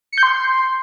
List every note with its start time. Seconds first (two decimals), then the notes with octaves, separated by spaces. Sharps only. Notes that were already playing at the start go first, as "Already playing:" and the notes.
0.12 C#7
0.18 G6
0.23 C6